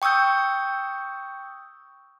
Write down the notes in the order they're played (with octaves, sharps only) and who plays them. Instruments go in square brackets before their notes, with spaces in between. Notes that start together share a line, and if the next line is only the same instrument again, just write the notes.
[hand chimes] G5 C#6 D#6 E6 G6